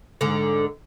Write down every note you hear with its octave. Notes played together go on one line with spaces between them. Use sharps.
G#2 D3